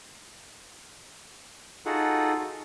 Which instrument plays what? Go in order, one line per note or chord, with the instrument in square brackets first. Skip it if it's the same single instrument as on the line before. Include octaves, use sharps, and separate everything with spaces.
[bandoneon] D#4 F4 F#4 G#4 A4 F#5